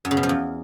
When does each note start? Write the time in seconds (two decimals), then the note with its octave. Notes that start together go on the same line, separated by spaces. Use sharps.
0.05 F#2
0.11 C#3
0.17 B2
0.23 F3
0.29 E2